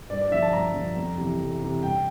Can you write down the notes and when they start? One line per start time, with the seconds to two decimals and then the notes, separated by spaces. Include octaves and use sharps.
0.10 G2 D5
0.21 D5
0.31 D3 F3 E5
0.43 A5
0.53 G2 A#5
0.74 D3 F3
0.97 F2
1.18 C3 E3
1.39 F2
1.61 C3 E3
1.82 G2 G5